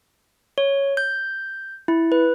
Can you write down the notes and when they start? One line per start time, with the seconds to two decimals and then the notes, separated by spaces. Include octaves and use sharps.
0.58 C#5
0.97 G6
1.88 E4
2.12 B4